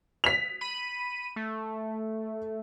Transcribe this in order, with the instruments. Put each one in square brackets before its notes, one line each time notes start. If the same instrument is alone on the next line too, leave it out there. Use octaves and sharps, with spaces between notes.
[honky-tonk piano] B6 F7
[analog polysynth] B5 D#7
A3